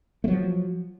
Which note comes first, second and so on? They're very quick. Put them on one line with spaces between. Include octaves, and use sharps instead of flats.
A3 F#3 F3